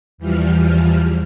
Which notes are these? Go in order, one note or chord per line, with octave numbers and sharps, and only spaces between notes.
E2 E3 F3 G3 F6